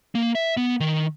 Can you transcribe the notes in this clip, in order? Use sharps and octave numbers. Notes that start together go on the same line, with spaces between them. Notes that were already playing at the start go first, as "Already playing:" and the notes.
A#3
E5
B3
D#3